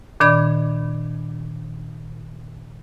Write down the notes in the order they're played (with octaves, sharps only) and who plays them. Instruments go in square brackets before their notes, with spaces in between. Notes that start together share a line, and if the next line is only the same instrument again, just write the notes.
[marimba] A#2 D#3 D4 D5 B5 G#6